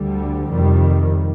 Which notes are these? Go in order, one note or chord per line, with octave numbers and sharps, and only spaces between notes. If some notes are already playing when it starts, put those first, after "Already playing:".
Already playing: D2 D3 G3
F2 C3 D#3 G3